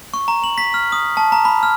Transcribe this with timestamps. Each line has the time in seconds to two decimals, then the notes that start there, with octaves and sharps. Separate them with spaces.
0.14 C#6
0.28 A#5
0.44 F#7
0.58 B6
0.74 F6
0.92 D#6
1.17 A5
1.32 A#5
1.45 B5
1.63 F6